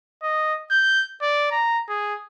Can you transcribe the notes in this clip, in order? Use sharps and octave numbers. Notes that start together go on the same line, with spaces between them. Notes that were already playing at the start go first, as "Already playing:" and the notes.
D#5
G6
D5
A#5
G#4